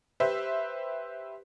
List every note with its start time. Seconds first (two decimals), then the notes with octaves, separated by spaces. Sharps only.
0.20 G4 B4 C5 E5